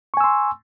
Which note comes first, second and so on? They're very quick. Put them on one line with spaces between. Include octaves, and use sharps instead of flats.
C#6 G#5 E6 C6